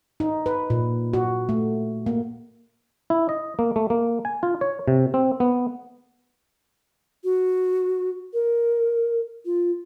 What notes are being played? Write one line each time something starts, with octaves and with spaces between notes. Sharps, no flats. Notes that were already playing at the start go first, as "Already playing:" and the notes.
D#4
B4
A#2
F#4
A3
A#3
E4
D#5
A#3
A3
A#3
G#5
F4
C#5
C3
C4
B3
F#4
A#4
F4